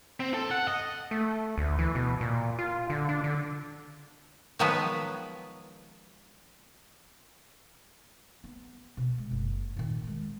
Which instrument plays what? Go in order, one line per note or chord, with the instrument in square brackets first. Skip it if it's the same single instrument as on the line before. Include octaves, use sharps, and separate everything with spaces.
[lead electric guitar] C4
A4
F#5
D#5
[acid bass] A3
D2
E3
B2
A#2
F4
D3
D4
D3
[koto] D#3 F3 F#3 G#3 B3 B4
[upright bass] B3
B2
G#3
F#1
A#2 D#3
G#3 C4